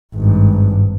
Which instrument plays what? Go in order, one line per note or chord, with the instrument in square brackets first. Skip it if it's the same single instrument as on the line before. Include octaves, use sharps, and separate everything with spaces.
[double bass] G#1 G2